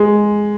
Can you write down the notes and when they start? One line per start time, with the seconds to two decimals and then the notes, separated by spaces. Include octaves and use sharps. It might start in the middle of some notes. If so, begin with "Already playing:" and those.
Already playing: G#3